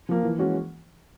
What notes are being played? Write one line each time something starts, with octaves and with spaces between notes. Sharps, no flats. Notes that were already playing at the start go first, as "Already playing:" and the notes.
F3 A#3
E3
G#3 C#4 F#4